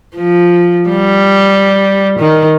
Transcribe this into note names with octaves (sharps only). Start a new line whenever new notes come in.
F3
G3
D#3